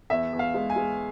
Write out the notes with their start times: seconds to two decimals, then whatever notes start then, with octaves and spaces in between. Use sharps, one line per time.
0.10 E2 E5
0.33 E2
0.39 F5
0.54 G#3
0.70 G#5
0.76 G#3